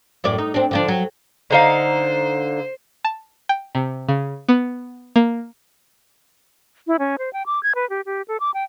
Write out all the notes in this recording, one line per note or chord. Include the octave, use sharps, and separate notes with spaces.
F#2 A2 D5
D#4
C4 D4
D3 F3 D4
F#3
D3 D#4 C5 F5
A5
G5
C3
C#3
B3
A#3
E4
C#4
C5
G5
D6
G#6
B4
G4
G4
A4
D6
G5